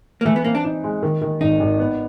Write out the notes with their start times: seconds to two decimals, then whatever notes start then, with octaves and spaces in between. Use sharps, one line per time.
0.21 A#3
0.25 E3 A3
0.36 B3
0.44 A#3 C4
0.55 D4
0.64 D#4
0.84 G#3
1.03 D#3
1.22 D#3
1.40 G#1 D#4
1.60 G#1
1.79 B3